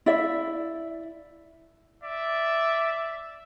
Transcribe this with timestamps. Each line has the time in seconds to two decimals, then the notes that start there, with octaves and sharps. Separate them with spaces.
0.06 E4 D5 E5
2.03 D5 E5